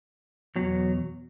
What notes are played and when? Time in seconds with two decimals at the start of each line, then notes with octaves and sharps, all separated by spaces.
0.56 E2 B2 F#3